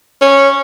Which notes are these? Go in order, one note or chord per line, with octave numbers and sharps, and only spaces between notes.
C#4